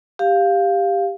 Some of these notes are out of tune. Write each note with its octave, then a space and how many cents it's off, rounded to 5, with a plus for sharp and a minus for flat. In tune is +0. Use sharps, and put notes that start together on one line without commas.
G4 +10 F5 +0